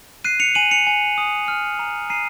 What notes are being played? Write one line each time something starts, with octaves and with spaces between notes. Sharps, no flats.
F#6 C7 D#7
C#7 F7
G#5 D#7 F#7
C#7 F7
G#5
D#6
F6
A#5
A#5 C7 D#7